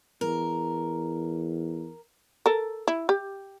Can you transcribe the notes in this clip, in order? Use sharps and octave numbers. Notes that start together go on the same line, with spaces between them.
E2 A#4
A4 A#4
E4
G4